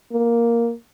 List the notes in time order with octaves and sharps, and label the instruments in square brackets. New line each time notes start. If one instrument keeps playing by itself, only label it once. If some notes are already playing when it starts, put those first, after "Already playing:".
[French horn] A#3